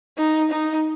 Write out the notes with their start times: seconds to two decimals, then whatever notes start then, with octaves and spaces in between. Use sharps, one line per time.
0.18 D#4
0.51 D#4